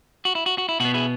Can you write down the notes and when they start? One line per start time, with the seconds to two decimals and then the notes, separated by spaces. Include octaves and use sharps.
0.25 F#4
0.35 E4
0.46 F#4
0.58 F#4
0.69 E4
0.80 B2 B3 F#4
0.94 E4 G#4